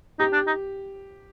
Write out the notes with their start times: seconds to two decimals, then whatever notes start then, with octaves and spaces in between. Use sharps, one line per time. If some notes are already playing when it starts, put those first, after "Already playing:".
0.19 D#4 G4
0.33 D4
0.47 D#4